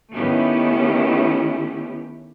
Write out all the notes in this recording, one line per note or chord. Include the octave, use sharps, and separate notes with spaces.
D#3 A3 B3 C#4 E4 G4